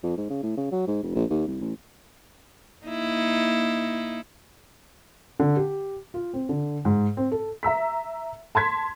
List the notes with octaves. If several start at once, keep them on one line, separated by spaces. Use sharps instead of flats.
F2
G#2
C#3
A2
C#3
F#3
G#2
F1
A#1
D#2
C2
A1
A#3 D#4 E4
D3
G4
F4
C4
D3
G#2
C4
A4
E5 A#5 E6 B6
A5 C6 G#6 B6